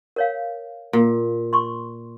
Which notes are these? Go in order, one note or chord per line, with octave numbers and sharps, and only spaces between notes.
A#4 C#5 F5
A#2
C6 C#6